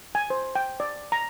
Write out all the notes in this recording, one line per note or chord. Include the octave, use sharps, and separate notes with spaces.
G#5
C5
G5
D5
A#5